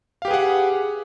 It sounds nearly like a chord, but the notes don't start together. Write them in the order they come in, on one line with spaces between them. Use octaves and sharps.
F5 G4 B4 G#4 F#5